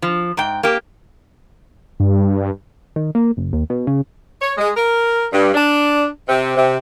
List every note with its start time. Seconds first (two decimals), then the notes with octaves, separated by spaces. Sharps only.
0.02 F3
0.37 G#2 G5
0.63 A#3 G4
2.00 G2
2.96 D#3
3.15 A#3
3.37 F#1
3.53 D#2
3.70 B2
3.87 C#3
4.42 C#5
4.58 G#3
4.77 A#4
5.33 G2
5.54 D4
6.28 C3
6.56 C3